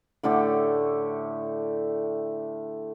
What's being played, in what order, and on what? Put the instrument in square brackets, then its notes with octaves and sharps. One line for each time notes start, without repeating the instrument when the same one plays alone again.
[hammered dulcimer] A2 D3 A3 G4